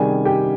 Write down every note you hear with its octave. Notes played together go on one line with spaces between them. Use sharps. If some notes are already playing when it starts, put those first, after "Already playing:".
Already playing: C3 D#3 G3 G#4 G#5
G4 G5